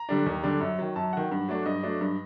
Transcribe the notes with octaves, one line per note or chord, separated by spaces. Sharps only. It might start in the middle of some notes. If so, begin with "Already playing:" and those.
Already playing: A#5
D3 G3 D4
D#2
D3 G3 D4
F#2
D#3 F#3
F#2 A5
D#3 F#3 F#5
G2
F#3 A3 D4
G2 D#5
F#3 A3 D4
G2